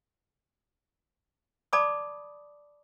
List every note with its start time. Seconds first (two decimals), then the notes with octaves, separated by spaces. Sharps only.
1.73 D5 A5 B5 D6 D#6